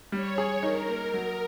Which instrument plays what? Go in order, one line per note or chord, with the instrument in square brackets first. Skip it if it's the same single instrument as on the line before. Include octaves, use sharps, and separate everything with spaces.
[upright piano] G3 [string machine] C#5
[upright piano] G#4
[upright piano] D#4 [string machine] A#4
[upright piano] A#3
F#3